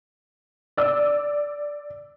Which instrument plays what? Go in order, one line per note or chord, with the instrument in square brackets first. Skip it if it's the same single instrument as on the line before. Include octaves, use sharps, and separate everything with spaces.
[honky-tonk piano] D5 E6